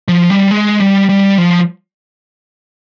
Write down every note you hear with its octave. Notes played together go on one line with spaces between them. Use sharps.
F3
G3
G#3
G3
G3
F3